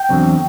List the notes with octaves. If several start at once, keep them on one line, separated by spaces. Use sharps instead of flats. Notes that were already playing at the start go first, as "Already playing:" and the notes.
Already playing: G5
E2 D3 F#3 C4